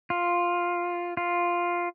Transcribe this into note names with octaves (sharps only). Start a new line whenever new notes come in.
F4
F4